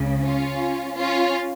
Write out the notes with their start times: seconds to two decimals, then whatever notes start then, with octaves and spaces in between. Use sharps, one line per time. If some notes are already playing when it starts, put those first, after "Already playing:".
Already playing: C#2 C#3
0.22 C#4 F4
0.97 C#4 F4